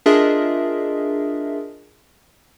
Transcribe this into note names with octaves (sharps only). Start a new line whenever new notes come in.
D4 F4 G#4 A#4 D#5 E5